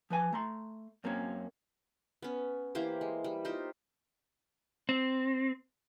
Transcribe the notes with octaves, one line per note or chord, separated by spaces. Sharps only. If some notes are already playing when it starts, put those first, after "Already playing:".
F3 B4 G#5
A3 A#5 C6
F#2 A#3 C4 C#4
B3 C#4
E3 A#3 G4 C5
G#3
G3
D#4 F4 G4 C5
C4